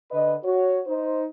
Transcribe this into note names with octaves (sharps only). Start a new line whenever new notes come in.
D3 B4 D#5
F#4 C#5
D#4 C5